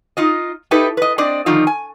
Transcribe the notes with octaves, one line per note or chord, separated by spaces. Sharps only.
D#4 F4 D#5
D#4 E4 G4 A4 B4
B4 D#5
C4 D4 D5 D#5
D3 D#3 F3 D#4 F4
G#5